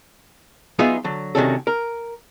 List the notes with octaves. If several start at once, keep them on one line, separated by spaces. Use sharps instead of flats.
F#3 B3 D#4 F4 G#4 E5
D3 F#3
C3 D#3 G3 C#4 F#4 A4
A#4